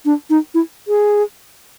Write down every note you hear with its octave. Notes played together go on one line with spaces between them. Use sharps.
D4
D#4
E4
G#4